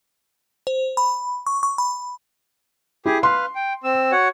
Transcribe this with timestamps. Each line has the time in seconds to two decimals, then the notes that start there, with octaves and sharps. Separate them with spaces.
0.67 C5
0.97 B5
1.47 C#6
1.63 C#6
1.78 B5
3.06 E4 G4 G#4
3.23 B4 F5 C6
3.55 G5
3.84 C4 E6
4.12 F#4 C#5 F#5